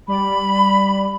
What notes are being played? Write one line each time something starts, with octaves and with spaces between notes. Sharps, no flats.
G3 D5 B5